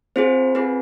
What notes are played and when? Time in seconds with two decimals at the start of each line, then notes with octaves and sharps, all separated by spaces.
0.16 C4 F4 G#4 C5
0.55 C4 F4 G#4 B4